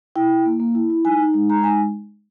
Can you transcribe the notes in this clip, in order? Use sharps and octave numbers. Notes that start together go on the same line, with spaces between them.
E4 G5
E4
A#3
A#3
E4
E4
D#4 G#5
D#4
G#3
G#3 A#5
D#4 G#5